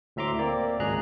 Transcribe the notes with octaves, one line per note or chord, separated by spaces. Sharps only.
D2 A2 E5 A#5 C6 D6
A#3 C4 D5
G#1 C#2 G#4 A#5 F#6